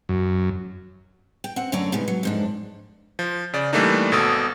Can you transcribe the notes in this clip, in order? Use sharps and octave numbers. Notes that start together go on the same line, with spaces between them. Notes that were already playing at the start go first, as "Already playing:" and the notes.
F#2
G5
C4 F#5
F#2 D3 A3 C#5 D5 A#5
G#2 C3 B3
F#3
F2 G#2 D4
F3
C#3 D5
E3 G3 A3 A#3 D4 D#4
G#1 B2 A4 D#6